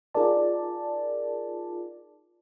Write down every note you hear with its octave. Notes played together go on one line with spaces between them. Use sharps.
D#4 F4 G#4 A#4 D5 A5